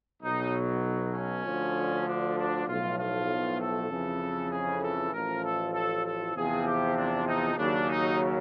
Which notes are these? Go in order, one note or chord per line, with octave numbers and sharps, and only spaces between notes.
B1 B2 F#3 D#4
C#4
D2 D3 F3
D4
D4
B1 A2 F3 F4
F4
A4
F2 C#3 E3
G#4
A4
A1 A2 F3 A#4
A4
A4
A4
E2 C3 F3 G#4
G4
D4
D#4
D#2 C#3 F#3 D4
D#4